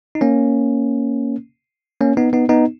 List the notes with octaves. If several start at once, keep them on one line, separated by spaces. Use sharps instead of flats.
D#4
A#3 C#4
A#3 C#4
B3 D#4
B3 D#4
B3 D#4